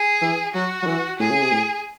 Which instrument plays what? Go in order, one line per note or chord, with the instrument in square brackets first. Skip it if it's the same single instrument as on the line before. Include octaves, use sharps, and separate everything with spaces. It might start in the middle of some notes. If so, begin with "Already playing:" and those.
Already playing: [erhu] G#4
[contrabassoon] E3
[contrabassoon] F#3 [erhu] F#4
[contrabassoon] F#3
E3
[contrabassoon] A2 [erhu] G#4
[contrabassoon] C#3
C3
A2